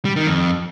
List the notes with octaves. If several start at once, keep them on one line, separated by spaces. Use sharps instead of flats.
G3
D#3
F2